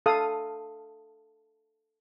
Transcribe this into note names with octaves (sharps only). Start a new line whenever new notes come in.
A4 F5 D#6